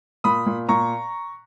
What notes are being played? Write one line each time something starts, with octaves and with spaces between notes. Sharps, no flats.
A#2 B5 D#6
A#2
A#2 A#5 C#6